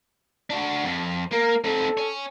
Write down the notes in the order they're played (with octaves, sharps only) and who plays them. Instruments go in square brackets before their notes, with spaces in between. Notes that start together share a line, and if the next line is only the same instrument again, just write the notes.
[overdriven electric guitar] D4 F#4
F2
[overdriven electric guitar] A#3 [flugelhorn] A#4
[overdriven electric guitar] C4 D#4 [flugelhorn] A4
[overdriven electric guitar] C#5 G#5